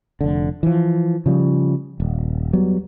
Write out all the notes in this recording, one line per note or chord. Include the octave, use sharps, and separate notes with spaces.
F1 D3
E3 F3
C#3 F3 G3
D#1
F#3 G3 B3